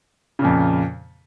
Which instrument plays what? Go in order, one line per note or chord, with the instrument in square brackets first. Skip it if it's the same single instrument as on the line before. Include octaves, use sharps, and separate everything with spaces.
[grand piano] C#3
A#2
F2